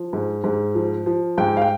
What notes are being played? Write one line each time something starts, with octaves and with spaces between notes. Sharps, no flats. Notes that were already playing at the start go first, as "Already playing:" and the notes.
Already playing: F3
G#2
G#2
F3
F3
G#2 G5
F5
G5